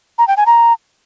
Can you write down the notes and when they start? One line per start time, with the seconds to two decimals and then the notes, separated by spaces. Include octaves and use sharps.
0.18 A#5
0.28 G5
0.37 G#5
0.46 A#5